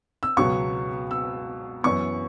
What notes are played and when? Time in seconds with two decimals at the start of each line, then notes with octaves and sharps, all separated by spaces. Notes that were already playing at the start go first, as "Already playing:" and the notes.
0.23 E6
0.37 C#2 B2 F#3 B3 C#6
1.11 E6
1.83 F#2 E3 B3 C#6